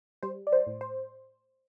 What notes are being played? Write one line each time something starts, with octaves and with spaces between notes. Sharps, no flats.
G3 C5
D5
C5
A2
C5